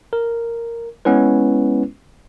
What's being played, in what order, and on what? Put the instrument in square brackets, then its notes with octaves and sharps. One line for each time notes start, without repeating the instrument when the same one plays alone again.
[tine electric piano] A#4
G#3 B3 C#4 E4 B4